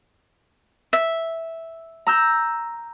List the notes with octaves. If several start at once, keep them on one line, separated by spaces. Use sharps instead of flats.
E5
A#5 E6 G6